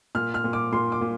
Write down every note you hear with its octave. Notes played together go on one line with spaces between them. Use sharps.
A#2 F6
F6
A#2
D6
A#2 C6
D6
A#2